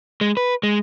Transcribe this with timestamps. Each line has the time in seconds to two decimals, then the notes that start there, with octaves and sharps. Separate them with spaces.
0.21 G#3
0.37 B4
0.63 G#3